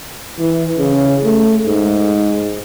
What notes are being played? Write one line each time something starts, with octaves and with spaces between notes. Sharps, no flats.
E3
C#3
A3
G#2